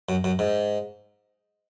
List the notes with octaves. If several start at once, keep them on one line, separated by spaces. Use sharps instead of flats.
F#2
F#2
G#2